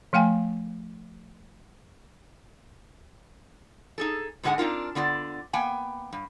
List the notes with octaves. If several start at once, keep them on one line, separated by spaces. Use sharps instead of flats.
F3 A3 F5 G5 G#5
D#4 G#4 A4
G#2 D3 G#3 E4 F#5 G#5
C4 D4 D#4 F4 A#4
D3 B3 F4 D5
A#3 B3 G5 G#5
G2